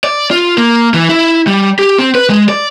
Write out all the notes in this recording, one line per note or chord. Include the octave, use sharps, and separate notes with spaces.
D5
F4
A#3
E3
E4
G3
G4
C4
B4
G#3
D5